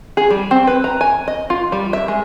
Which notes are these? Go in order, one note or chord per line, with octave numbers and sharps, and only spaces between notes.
G#4
G3
C4
B4
A#5
G#5
D#5
F4
G3
E5
G#3